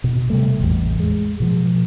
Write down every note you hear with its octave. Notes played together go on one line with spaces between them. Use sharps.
B2
C3 G3 A3
A1 E2
G#3
B2 F3